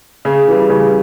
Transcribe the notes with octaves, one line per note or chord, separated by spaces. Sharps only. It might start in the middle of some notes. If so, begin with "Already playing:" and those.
C#3
E3 G3
C#3